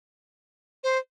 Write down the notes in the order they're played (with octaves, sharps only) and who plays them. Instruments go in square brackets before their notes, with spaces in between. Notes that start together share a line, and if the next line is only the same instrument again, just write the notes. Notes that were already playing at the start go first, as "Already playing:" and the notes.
[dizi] C5